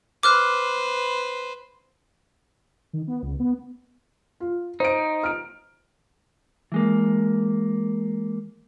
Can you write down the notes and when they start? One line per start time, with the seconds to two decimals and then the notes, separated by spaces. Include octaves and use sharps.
0.23 B4 C5 D6 F6 F#6
2.93 D#3
3.08 B3
3.23 C#2
3.40 B3
4.40 F4
4.80 D#4 C5 D7
5.23 F6 D7
6.72 E3 G#3 A#3